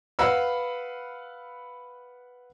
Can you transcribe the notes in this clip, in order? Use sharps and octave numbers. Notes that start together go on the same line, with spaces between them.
B4 F5 F#5 B5 E6